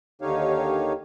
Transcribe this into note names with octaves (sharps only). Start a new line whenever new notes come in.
D#2 D3 D#4 G4 C#5 F5